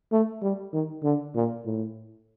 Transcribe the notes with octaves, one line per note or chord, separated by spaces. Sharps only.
A3
G3
D#3
D3
A#2
A2